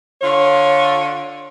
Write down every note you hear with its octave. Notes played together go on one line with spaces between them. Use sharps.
D3 F4 C#5